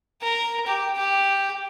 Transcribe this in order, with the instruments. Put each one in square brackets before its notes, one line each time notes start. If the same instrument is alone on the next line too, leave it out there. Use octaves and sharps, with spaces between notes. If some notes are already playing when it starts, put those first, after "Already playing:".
[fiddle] A#4
G4
G4